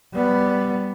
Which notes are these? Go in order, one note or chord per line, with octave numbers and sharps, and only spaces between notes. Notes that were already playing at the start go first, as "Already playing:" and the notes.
G3 B3